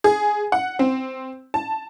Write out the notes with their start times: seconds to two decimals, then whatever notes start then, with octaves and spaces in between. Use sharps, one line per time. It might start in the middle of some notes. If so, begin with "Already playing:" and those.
0.04 G#4
0.52 F#5
0.79 C4
1.54 A5